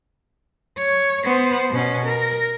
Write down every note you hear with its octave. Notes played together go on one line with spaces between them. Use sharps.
C#5
B3 C5
B2 C#4
A#4